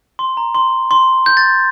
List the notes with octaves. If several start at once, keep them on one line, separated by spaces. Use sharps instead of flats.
C6
A#5
C6
C6
G6
A6